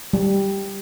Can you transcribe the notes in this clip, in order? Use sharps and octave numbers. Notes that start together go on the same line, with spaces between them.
G3